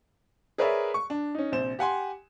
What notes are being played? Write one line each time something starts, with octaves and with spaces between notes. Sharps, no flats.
G#4 A#4 B4 C#5 D5 E5
C#6
D4
C#4 D#4
A#1 C3 C5 E7
G4 F#5 G#5 C6